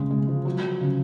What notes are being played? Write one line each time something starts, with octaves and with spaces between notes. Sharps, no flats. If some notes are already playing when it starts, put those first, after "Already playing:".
Already playing: C#3 G#3
G#3
F3
F#3
F#3
C#3